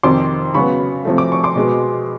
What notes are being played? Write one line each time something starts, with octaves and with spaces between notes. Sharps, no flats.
F2 C3 D#3 C6 D6
C#3 F#3 B3 B5 C#6
C3 F3 A3
D6
C#6
C6 D6
B2 G#3 B3